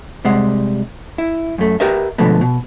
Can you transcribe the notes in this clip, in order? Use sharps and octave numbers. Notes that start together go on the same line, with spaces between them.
C3 G3 G#3 F#5
E4
F#2 A3
G4 A#4 B4 D#5 E5
B2 D3 F3 G#3 A3 B3
B2